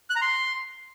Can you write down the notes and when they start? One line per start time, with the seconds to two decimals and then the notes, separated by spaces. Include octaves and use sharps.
0.10 F#6
0.16 A#5
0.22 C6